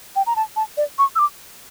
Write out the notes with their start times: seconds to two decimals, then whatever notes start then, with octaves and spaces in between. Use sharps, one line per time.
0.16 G5
0.26 A#5
0.36 A5
0.56 A5
0.77 D5
0.99 C#6
1.16 E6
1.19 D6